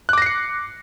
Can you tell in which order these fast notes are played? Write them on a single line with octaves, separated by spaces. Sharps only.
F#6 D6 A#6 C7 C#7